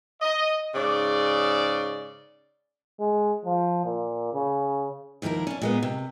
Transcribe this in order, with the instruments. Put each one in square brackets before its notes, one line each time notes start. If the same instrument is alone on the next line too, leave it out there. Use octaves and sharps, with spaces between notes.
[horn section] D#5
G#2 C#3 D5
[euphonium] G#3
F3
A#2
C#3
[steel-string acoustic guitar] D#2 F3 E4 A4 A#4
C#4 D4
A#2 G#3 B3
C3